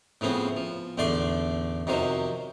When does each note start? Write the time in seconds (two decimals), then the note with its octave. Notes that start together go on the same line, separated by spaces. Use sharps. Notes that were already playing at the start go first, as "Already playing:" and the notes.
0.21 A2 C#3 F3 B3 C4
0.57 F3
0.98 A1 E2 D3 A3 D5 C6
1.87 F2 C3 D#3 F#3 C5